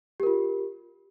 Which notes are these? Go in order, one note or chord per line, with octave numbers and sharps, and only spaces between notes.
F4 G4 A#4